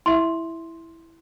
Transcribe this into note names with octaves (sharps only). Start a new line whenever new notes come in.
E4 E5 C6